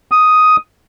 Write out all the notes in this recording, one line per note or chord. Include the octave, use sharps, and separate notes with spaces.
D#6